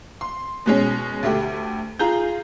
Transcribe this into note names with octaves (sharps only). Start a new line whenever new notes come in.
C6
B2 G#3 C#4
D2 A3 G4
F4 G#4 A#5 G6